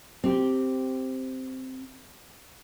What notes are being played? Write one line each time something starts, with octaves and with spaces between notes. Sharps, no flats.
C4 G4